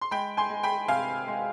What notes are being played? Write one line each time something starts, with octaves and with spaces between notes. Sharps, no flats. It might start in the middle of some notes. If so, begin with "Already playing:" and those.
C6
G#3 G5 B5
G#5 C6
G#3
G5 B5
C3 F5 G#5
G#3